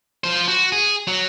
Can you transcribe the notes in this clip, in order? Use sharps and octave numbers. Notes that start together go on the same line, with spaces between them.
F4 C5
F#4
G#4
F#3